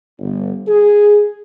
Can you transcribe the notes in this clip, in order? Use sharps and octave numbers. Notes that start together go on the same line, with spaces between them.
G1
G#4